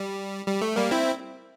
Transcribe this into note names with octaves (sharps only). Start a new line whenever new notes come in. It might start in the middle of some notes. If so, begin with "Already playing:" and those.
Already playing: G3
G3
A3
G3 A#3
C4 E4